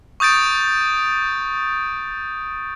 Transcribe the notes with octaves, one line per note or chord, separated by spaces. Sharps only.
C#6 D#6 G6 A6 D7